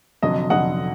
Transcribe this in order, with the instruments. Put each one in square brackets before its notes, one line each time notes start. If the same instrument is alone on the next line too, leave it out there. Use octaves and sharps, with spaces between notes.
[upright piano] F1 F2 D3 F#3 D#5
F1 F2 D3 F#3 D#5 F#5